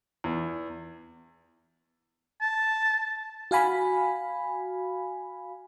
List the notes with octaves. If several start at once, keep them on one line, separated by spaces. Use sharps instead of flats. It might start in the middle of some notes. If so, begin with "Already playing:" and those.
E2
A5
F#4 F5 G#5 B5